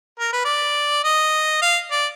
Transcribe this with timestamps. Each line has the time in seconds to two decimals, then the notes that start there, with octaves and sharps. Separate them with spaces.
0.19 A#4
0.33 B4
0.45 D5
1.04 D#5
1.62 F5
1.91 D5